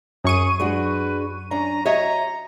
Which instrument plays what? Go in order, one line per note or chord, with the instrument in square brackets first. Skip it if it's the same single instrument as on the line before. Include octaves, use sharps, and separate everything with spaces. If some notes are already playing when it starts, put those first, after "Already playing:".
[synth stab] F#2 C#6 D#7 [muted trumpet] G#4
[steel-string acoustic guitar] G#3 D4 F#4 [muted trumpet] B4
[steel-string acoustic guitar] C#4 D4 [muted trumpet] A#5
[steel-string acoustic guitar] F#4 E5 [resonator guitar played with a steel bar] C#5 D#5 [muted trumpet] A#5